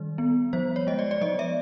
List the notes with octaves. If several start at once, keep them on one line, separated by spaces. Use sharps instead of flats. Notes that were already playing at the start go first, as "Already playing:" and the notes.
Already playing: D#3 G3
B3
F3 C5
C#5
G#3 D#5
D5
D5
F3 D#5
E5